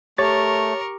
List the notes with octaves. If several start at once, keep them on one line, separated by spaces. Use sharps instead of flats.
A3 G4 A#4 C#5 C#6 A6